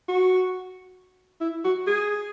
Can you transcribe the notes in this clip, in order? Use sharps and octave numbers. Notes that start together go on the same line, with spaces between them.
F#4
E4
F#4
G#4